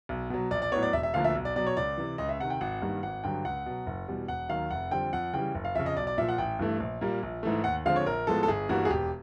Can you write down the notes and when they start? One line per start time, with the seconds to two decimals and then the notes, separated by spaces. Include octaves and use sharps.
0.09 B1
0.30 B2 F#3
0.51 A#1 D5
0.62 D5
0.72 A2 F#3 B3 C#5
0.83 D5
0.93 E1 E5
1.03 E5
1.14 D2 D3 F3 A#3 F5
1.24 E5
1.35 B1
1.45 D5
1.56 B2 F#3 D5
1.66 C#5
1.77 C#2 D5
1.98 C3 E3
2.18 C#2 D#5
2.29 E5
2.40 C3 D#3 F#5
2.50 G5
2.61 G#1 F#5
2.82 G2 D#3 G3 A#3
3.03 G#1 F#5
3.24 G2 D3 F#3 G5
3.44 C#2 F#5
3.66 B2 F#3
3.86 F#1
4.08 E2 B2 G3
4.28 E1 F#5
4.49 D#2 D#3 F#3 F5
4.70 F1 F#5
4.91 F2 D3 G3 C4 G5
5.13 F2 F#5
5.33 C#3 E3 G3 G5
5.55 F#1
5.65 F5
5.75 F2 C#3 E5
5.86 D#5
5.97 B1 D5
6.07 D5
6.18 A#2 F3 E5
6.29 F#5
6.38 A1 G5
6.59 G2 E3 A3
6.80 A#1
7.01 A#2 G3 A#3
7.23 A#1
7.43 G#2 E3 A3
7.64 D#2 F#5
7.85 D3 F3 G#3 C4 F5
7.96 C#5
8.06 A#1 A#4
8.27 A2 F3 G#3 B3 A4
8.43 A4
8.48 G1 G#4
8.69 G2 E3 G3 A#3 F#4
8.85 G#4
8.90 E1 G4